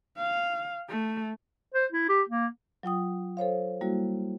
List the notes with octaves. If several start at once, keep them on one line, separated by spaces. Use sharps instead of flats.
F5
A3
C5
E4
G4
A#3
F#3 F4 G5 D#6
A4 C5 C#5 F5
G3 A#3 E4 F#4